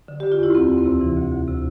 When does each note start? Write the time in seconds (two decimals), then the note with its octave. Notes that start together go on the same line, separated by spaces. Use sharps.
0.08 D3
0.20 D3 G4
0.32 F4
0.39 E2 E4
0.55 D2 C4
0.70 D2
0.78 C4
0.86 C3
1.01 E3
1.17 D2
1.32 D2
1.47 C3